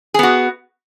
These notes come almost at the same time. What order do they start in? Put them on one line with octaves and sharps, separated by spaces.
G#4 B3 F#4